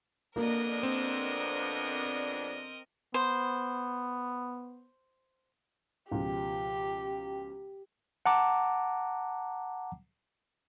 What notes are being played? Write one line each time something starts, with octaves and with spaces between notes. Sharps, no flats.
F2 A#3 B3 D4 A#4 D#5
C4
B3 C5
C#2 B2 F3 G4
F#5 A5 A#5 D6